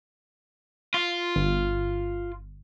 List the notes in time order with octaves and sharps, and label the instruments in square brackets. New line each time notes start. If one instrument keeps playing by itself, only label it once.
[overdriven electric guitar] F4
[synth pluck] G1